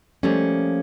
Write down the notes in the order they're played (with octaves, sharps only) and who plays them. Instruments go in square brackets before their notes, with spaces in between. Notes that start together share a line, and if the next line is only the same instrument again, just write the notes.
[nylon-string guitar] F3 G3 A3 A#3 C#4